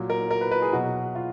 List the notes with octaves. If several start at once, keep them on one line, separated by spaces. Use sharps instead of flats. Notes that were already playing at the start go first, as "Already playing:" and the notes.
Already playing: A#2 F#3
A#4
A#4
B4
B4
G#4
B2 F#3 F#4
F4